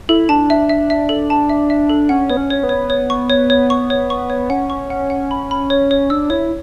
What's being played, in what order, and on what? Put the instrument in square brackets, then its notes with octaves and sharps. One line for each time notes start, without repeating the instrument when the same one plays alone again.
[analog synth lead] E4 [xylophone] A4
[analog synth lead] D4 [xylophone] A5
[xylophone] E5
E5
E5
A4
A5
E5
E5
A4
[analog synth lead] C#4 [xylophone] F#5
[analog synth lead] B3 [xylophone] C#5
[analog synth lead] C#4
[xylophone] C#5
[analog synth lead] B3
[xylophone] C#5
C#5
C#6
C#5
C#5
C#6
C#5
C#6
C#5
[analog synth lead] C#4 [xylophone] F#5
[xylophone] C#6
F#5
F#5
B5
B5
C#5
C#5
[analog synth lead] D4 [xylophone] E6
[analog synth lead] E4 [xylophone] C#5